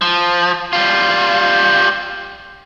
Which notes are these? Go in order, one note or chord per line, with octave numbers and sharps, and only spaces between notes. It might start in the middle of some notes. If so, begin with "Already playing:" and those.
F3
G3 F4